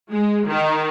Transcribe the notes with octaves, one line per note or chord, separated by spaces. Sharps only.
G#3
D#3